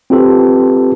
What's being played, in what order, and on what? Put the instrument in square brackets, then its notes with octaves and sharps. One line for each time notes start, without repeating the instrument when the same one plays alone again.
[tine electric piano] C4 F4 G4 A4 B4